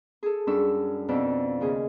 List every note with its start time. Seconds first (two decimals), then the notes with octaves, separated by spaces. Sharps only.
0.23 G#4 A4
0.47 F#2 G3 D4 A4 C#6 E6
1.08 F2 B2 D5 E6
1.60 D#2 C#3 G#4